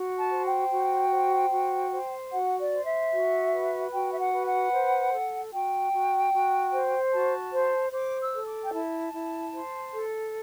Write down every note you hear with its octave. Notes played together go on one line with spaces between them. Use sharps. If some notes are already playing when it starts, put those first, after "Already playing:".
Already playing: F#4
A5
C5
G5
F#4
C5
F#4
C5
F#4 F#5
D5
C5
E5
F#4
B4
F#4 G5
E5
F#5
B4
F#5
C5
A4
F#4 G5
F#4
F#4
C5
F#4 A5
C5
C5 D6
E6
A4
D6
G5
E4 A5
E4
C5
A4